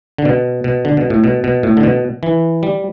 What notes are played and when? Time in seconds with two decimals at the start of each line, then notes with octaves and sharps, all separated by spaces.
0.18 D3
0.25 B2
0.64 B2
0.85 D3
0.97 B2
1.10 A2
1.24 B2
1.44 B2
1.63 A2
1.77 D3
1.83 B2
2.23 E3
2.63 G3